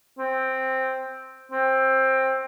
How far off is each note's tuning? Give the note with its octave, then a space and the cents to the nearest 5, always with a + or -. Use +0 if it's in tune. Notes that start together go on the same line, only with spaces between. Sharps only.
C4 +5
C4 +15